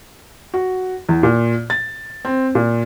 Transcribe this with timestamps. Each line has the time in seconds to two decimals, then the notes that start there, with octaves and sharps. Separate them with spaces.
0.54 F#4
1.09 E2
1.23 A#2
1.70 A6
2.25 C4
2.55 A#2